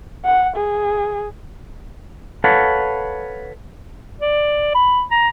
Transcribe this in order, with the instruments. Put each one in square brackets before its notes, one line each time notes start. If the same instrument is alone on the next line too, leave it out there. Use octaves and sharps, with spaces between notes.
[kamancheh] F#5
G#4
[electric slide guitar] A4 B4 C#5 F5 F#5
[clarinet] D5
B5
A#5